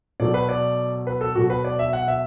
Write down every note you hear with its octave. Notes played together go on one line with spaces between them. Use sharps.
B2 F#3 A3 D5
B4
D5
B4
A4
B2 F#3 A3 F#4
B4
D5
E5
F#5
E5